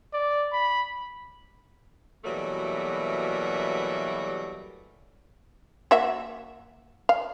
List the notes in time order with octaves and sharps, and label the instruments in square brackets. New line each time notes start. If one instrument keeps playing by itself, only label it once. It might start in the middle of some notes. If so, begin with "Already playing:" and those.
[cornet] D5
B5
[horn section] B2 E3 F#3 G3 A3 A#3
[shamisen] A#3 F#4 E5
F5